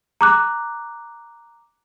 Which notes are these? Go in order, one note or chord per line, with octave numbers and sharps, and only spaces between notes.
A#5 D6 F#6